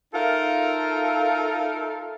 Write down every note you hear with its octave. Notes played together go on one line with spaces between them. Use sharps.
D#4 F4 A4 A#4 E5 F5